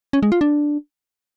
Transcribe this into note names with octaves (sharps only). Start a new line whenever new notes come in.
C#4
G#3
F4
D4